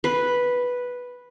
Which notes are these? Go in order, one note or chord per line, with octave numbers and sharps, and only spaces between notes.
B4